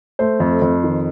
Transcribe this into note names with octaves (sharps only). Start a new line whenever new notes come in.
A3 C5
F2
F2
D#3